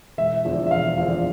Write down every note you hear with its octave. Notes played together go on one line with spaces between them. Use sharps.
E1 E5
E2 D3 F3
E5
E1 F5
E2 D3 F3 F5